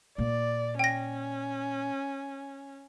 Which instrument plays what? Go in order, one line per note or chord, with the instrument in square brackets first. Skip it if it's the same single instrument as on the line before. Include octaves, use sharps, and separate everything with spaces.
[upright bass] A#2 A#3 [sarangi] D5
[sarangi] C#4 [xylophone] G5 A#6